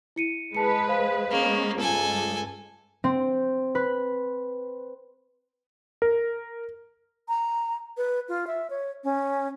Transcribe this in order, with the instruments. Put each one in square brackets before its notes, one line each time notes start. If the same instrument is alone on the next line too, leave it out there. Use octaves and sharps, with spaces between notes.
[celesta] E4 C#7 D#7
[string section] G#3 B4 [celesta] A5 C#7
[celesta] C5 F5
[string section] G#3 B3 C#4 [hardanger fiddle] A#3
[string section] C#2 G2 G#3 [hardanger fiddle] A4 G#5
[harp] C4
B4
[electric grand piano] A#4
[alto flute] A#5
B4
F4
E5
C#5
C#4